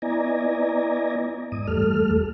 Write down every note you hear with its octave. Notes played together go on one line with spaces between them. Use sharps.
B3 E4 D5 D#5 G#5 A#5
G#2 D#6
E2 G3 A3 A4 F6